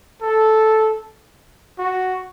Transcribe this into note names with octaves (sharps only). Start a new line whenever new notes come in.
A4
F#4